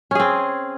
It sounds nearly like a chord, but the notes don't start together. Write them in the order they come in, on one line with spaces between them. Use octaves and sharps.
C#4 G#4 C4